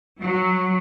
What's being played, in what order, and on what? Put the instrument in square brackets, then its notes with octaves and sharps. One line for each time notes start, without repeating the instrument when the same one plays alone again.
[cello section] F#3